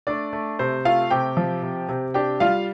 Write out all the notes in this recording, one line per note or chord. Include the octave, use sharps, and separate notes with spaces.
A3 D4 D5
A3
C3 C5
A3 F4 F5
C3 G4 G5
F3
C3
C3
D4 G4 G5
G3 F4 F5